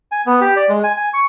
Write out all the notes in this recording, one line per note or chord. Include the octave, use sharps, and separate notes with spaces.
G#5
B3
G4
D5
G#3
G#5
G#5
C#6